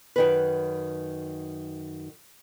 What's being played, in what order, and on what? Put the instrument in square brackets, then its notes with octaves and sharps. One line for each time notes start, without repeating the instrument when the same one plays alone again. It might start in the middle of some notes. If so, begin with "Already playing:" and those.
[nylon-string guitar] F#2 D#3 B4